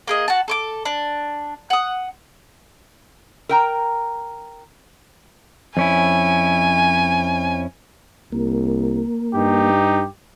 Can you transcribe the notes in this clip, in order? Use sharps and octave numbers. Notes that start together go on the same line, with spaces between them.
A#3 G#4 D#5
F#4 A5
A4 C#6 D6
D4
F#5 D#6
A#4 G5 A#5
F2 C#4 E4 G#5
C2 A#3
G2 D#4 G4